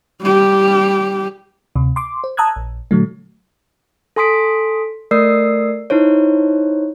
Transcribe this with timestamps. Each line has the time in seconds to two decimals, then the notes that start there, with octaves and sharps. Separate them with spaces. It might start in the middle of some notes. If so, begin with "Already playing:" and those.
0.21 G3 G4
1.76 D2 C3
1.96 C6 D6
2.24 C5
2.37 A5 A#5 D#6 E6 F#6 G#6
2.56 A#1
2.91 A#2 D3 F#3 A3
4.16 A4 G#5 C6 D#6 B6 D7
5.11 A3 A#4 D5 D#6 E6 C7
5.90 D#4 E4 C5 C#5